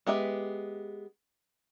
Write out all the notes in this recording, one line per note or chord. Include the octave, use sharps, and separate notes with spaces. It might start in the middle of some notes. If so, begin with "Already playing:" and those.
G#3 B3 G4 E5